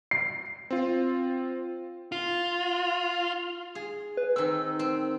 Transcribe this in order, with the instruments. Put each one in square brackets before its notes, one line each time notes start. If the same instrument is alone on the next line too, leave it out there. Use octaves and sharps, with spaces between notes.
[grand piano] C7
[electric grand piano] C4 F4
[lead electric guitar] F4
[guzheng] G#4
[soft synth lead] B4
[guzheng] D#3 C4 [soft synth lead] E6
[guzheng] C4